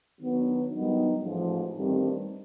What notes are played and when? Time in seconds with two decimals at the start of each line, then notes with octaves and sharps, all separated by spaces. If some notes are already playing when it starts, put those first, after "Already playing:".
0.20 D#3 F#3 B3 D4
0.70 G2 D#3 F#3 B3 D#4
1.21 A1 G#2 F3
1.73 A1 G2 D#3 G3 C4